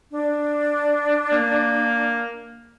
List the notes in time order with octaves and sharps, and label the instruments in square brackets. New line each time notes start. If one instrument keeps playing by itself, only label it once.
[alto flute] D4
[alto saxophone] A#3